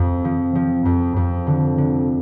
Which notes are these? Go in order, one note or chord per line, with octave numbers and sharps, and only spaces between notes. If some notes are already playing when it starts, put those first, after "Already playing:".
Already playing: F2
F3
F3
F2
F2
D3
D3